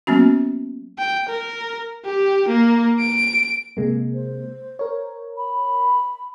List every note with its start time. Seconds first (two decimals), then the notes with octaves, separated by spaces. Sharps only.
0.07 F#3 A#3 B3 C#4 F#4
0.99 G5
1.29 A#4
2.05 G4
2.49 A#3
3.00 D7
3.77 C3 G#3 A#3
4.14 C5
4.79 A#4 C#5
5.37 B5